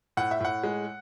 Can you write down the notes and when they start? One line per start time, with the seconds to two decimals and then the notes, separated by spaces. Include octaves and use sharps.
0.17 A2 F#5
0.31 E5
0.40 A2 F#5
0.64 G#3